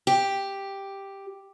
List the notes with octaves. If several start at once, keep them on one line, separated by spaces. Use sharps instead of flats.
G4